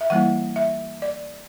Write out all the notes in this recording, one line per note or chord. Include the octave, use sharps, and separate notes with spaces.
E5
E3 G3 A#3 E4 F#5
E5
D5